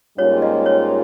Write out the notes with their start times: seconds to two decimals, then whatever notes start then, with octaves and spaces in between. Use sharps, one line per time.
0.18 G#2 G3 A#3 C#4 F4 C#5
0.42 D#5
0.66 C#5